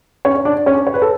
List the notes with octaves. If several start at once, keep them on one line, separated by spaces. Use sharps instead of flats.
C#4 C#5
D4 D5
C#4 C#5
C#5
B4
A4